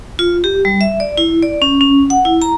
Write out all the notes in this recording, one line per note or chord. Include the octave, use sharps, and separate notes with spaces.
F4
G4
G3
E5
D5
E4
D5
C#4
C#4
F#5
E4
A#5